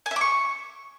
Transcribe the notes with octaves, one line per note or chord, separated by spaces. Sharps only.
G#5
E5
D6
C#6